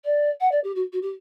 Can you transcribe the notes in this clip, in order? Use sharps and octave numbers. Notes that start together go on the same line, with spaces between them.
D5
F#5
D5
G4
F#4
F#4
G4